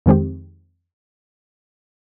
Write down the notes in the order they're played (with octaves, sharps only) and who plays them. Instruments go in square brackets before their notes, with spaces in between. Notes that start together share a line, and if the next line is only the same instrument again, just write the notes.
[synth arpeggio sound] F2 D#3 G#3 C4 G4